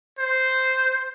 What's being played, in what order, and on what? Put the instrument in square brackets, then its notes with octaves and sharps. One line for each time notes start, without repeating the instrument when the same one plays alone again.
[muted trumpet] C5